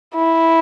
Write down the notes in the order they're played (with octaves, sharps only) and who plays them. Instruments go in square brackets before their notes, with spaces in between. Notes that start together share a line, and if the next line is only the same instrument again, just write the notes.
[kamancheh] E4